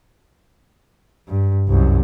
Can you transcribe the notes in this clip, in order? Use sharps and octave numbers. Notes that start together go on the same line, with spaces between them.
G2
C2 F#2